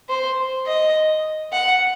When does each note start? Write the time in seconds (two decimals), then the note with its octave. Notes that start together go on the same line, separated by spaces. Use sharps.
0.09 C5
0.66 D#5
1.53 F#5